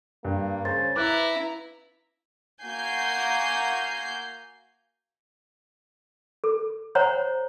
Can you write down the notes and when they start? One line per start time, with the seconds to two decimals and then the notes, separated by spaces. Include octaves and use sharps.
0.25 G2 A#3
0.65 C#3 C5 A6
0.96 E4 B4 A#5 D6 F#6
2.63 A#3 F#4 G#5 G6 C7
6.44 A4
6.95 C5 C#5 F#5 A#5